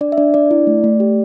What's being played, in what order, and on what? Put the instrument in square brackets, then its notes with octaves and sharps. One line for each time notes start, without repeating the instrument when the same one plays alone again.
[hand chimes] D4 D5
E5
D4 D5
D4 D5
E4
A3
A3
G4